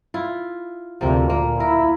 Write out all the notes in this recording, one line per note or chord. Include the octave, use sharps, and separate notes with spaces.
E4 F4
D2 C3 F3 A#3
A#2 A#3
E4 A#4